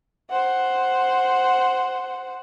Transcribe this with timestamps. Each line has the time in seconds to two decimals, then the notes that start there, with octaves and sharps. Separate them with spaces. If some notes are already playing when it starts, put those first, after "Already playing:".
0.30 C5 F#5